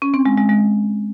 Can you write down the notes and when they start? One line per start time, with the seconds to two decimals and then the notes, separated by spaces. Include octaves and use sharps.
0.02 C#4
0.14 C4
0.26 G#3
0.37 G#3
0.49 G#3